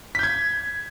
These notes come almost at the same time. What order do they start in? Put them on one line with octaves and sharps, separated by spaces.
B6 G6 G#6